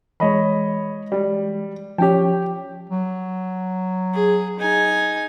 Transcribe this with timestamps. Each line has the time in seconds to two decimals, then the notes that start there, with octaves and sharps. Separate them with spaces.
0.20 E3 G#3 C#5 D#5 B5
1.12 G3
1.98 F3 C#4 G4 C#5 G5
2.89 F#3
4.14 G#4
4.59 D#4 G#5